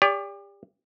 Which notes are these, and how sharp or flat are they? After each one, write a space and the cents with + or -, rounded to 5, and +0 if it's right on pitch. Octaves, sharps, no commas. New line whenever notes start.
G4 +35 D5 -30